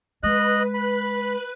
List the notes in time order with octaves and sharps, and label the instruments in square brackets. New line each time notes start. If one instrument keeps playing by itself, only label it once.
[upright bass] G#3 [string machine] B4 [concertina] D#5 F#6
[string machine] B4 F#6 [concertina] B5